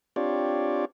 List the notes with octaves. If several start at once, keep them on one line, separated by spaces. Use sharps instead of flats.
C4 D4 F4 G4 C#5 D5